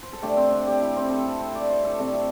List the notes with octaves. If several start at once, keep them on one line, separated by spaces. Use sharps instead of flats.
C5
A4
D3 A3 G4
C4
D4
G4
E4
C4
A4
A4
C5
D5
C5
A4
C3 A3 D5
E5